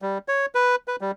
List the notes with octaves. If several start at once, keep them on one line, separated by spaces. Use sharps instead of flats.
G3
C#5
B4
B4
G3